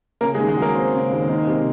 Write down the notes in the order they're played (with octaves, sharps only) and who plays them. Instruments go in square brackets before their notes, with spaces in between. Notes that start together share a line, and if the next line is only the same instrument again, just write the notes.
[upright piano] C#3 [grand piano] A#3 A#4
[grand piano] G#3 G#4
[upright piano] D#2
[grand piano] G#3 G#4
[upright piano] F#3
[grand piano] A#3 A#4
[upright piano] C4
C#3
D#2
D#3
C3